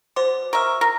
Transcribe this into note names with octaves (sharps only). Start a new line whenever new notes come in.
B2 C5 C6 D6
A#4 E5 C#6 F6
A#4 A#6